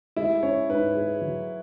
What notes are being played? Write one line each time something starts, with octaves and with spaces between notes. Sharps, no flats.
G#3 E4
C#4 C#5
G#2 B4
G#4
F#3